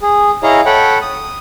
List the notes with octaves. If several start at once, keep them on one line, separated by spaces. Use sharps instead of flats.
G#4
E4 G#4 C#5 D#5 F5 A#5
A4 C#5 F#5 G5 B5
D#6